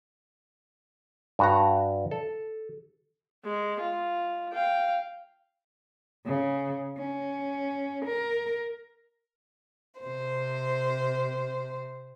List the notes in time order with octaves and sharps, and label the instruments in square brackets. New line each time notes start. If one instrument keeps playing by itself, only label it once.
[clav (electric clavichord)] G2 F#4 A#5
A4
[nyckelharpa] G#3
F4
F5 G5
[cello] C#3
C#4
A#4
[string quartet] C3 C5